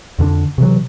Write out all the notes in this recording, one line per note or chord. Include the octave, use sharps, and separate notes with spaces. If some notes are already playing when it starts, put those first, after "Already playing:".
F2 D3 D4
C3 E3 F#3